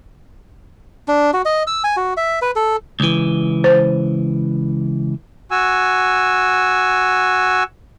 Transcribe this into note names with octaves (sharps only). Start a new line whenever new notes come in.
D4
F#4
D#5
E6
G#5
F#4
E5
B4
A4
C#2 E3
C5
F#4 G#5 E6